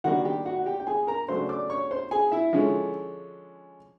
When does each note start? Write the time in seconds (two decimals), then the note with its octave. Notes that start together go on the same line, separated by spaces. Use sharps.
0.04 D#3 G3 A#3 D4 F#4 F#5
0.25 G4 G5
0.46 F#4 F#5
0.59 F#5
0.66 G4 G5
0.80 G5
0.87 G#4 G#5
1.07 A#4 A#5
1.28 C#3 F#3 A3 D4 C5 C6
1.49 D5 D6
1.70 C#5 C#6
1.91 C5 C6
2.11 G#4 G#5
2.32 E4 E5
2.53 D3 F3 G#3 C#4